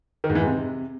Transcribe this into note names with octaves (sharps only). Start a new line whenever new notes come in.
D#3
G#2
E3
G#2
C3